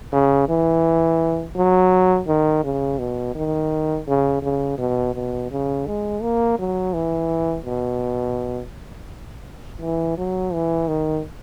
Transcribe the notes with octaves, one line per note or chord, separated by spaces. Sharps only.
C#3
E3
F#3
D#3
C#3
B2
D#3
C#3
C#3
B2
B2
C#3
G#3
A#3
F#3
E3
B2
E3
F#3
E3
D#3